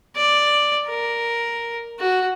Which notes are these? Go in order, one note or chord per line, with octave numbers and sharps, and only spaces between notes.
D5
A#4
F#4